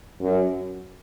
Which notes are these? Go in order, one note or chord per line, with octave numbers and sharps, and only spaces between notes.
F#2